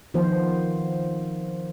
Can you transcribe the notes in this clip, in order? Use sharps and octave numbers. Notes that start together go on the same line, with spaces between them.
D#3 F3 B3 C5